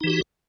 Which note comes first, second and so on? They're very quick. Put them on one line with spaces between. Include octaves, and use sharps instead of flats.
D#4 E3 G4 F#4